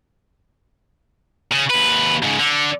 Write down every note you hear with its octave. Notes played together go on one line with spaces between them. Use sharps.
C#3
D#2 B4
G#2 C#3
D3